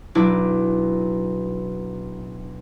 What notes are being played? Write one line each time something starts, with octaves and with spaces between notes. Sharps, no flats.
B1 D4 E4 D6